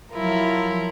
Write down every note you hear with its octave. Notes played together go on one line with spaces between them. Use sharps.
F3 F#3 E4 F4 A#4